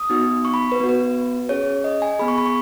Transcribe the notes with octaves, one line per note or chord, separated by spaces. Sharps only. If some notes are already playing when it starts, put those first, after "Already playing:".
Already playing: D#6
B3 D#4 F#4
C#6
B5
B4
B3 F#4
B4
C#4 G#4 C#5
D#5
G#5
B3 G#4 B5
C#6
B5
C#6